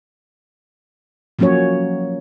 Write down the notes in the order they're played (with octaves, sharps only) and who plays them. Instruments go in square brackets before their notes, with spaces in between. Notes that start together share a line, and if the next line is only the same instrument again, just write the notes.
[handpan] F3 F#3 A#3 C#4 F#4 C#5